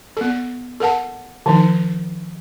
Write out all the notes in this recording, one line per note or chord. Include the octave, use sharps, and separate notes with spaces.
B3 A4
A4 A#4 F#5 A5
D#3 F3 D#4